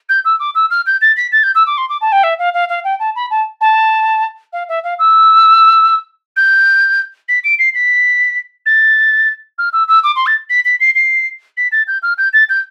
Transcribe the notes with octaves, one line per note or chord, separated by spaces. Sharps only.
G6
E6
D6
E6
F6
G6
A6
B6
A6
G6
E6
D6
C6
D6
A5
G5
E5
F5
F5
F5
G5
A5
B5
A5
A5
F5
E5
F5
E6
G6
B6
D7
C7
B6
A6
F6
E6
E6
D6
C6
A6
B6
B6
C7
C7
B6
A6
G6
F6
G6
A6
G6